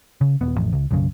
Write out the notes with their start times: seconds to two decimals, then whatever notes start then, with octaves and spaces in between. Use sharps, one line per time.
0.21 C#3
0.41 D#1 B3
0.57 A1 F2
0.73 C#2
0.91 B1 F#2 C#3